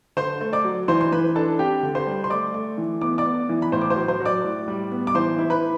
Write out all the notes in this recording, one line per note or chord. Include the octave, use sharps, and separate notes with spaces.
D3 C5 C6
A3
D5 D6
F#3
E3 C5 C6
C6
E3 B4 B5
D4 A4 A5
C4 G4 G5
D3
C5 C6
G3
C6
A3 D5 D6
A3
E3
B3 D6
D5 D6
B3
E3
B5
A2 C5 C6
D6
C5 C6
F#3
C5 C6
F#3
D5 D6
A2
G3
B3
D6
E3 C5 C6
E4
B4 B5